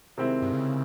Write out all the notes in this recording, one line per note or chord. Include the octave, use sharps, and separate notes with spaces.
C3 D#3 G#3 C4 E4
G2
C#3